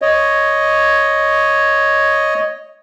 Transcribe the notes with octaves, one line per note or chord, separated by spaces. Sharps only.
C#5 D#5